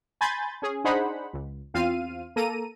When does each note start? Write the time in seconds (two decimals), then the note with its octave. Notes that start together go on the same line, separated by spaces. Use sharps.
0.21 G#5 B5 C6 G6 A6
0.62 C#4 G#4
0.84 D4 D#4 G#4 C5 F#5 B5
1.33 C#2
1.74 E2 C4 F4 F5 F6 D#7
2.36 A#3 A4 A#5 D#7